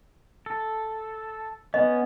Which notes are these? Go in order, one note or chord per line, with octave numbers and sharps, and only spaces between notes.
A4
B3 C#4 D#5